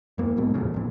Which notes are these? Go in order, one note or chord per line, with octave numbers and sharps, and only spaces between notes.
F#2 A#3
B1 G#2 B2
E1 F2 A#2 C#3
G#1 A#2